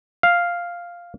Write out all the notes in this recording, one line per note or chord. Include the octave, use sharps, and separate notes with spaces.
F5